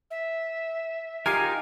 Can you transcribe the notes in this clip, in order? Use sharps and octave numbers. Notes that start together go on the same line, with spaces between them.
E5
D#4 F4 G4 A#4 F5 G#5